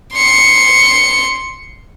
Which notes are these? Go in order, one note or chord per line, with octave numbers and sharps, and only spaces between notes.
C6 C#7